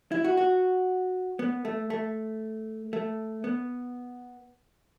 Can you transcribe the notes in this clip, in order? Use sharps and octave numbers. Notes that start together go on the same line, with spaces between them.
E4
F#4
F#4
B3
A3
A3
A3
B3